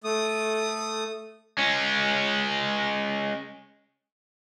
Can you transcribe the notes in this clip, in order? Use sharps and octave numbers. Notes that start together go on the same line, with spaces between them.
A3 D#6
G#3 C#4